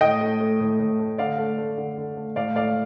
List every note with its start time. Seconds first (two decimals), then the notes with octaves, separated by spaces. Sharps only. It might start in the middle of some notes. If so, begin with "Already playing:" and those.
0.01 A2 D#5 G5
0.21 A3
0.40 A3
0.60 A2
0.80 A2
0.99 A3
1.18 D3 D5 F5
1.38 A3
1.58 A3
1.78 D3
1.97 D3
2.17 A3
2.36 A2 D5 F5
2.56 A2 D5 F5